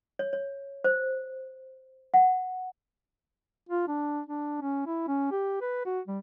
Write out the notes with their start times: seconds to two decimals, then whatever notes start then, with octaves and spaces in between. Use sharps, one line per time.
0.19 C#5
0.33 C#5
0.84 C5
2.14 F#5
3.69 F4
3.88 D4
4.26 D4
4.61 C#4
4.87 E4
5.08 C#4
5.31 G4
5.61 B4
5.85 F#4
6.07 G3